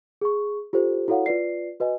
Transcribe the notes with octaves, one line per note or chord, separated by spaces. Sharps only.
G#4 C#6
F4 G4 A4 C5
E4 F#4 A4 C#5 F5 F#5
F4 B4 D5 C7
F#4 B4 D#5 G#5